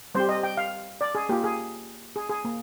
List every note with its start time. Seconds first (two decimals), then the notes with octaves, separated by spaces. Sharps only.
0.15 G3 C4 G4 C5
0.29 D#5
0.43 G5
0.57 F5
1.01 D5
1.15 G#4
1.29 A#3 G4
1.32 F4
1.44 G#4
2.16 G#4
2.30 G#4
2.45 A#3